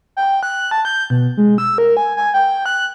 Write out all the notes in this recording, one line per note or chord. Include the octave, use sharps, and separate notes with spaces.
G5
F#6
A5
G6
B2
G#3
E6
A#4
G#5
G#5
G5
F#6